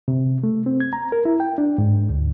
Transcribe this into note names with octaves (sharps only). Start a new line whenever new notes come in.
C3
A3
C4
G#6
A#5
A#4
E4
G5
D4
G#2
D2